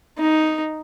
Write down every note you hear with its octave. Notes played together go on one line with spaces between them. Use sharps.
D#4